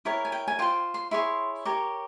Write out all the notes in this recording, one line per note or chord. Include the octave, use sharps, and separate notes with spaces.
E4 A#4 C#5 G5
G#5
G5
G#5
F4 C5 G5
C6
E4 G#4 C#5 C6
G4 A#4 C#5 C#6